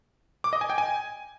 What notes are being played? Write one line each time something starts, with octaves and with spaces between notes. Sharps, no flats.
D6
D#5
G#5
G5
G#5